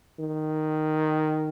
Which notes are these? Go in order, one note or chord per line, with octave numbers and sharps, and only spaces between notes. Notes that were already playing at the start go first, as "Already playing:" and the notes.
D#3